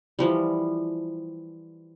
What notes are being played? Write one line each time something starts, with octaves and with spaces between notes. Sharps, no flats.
E3 F3 G3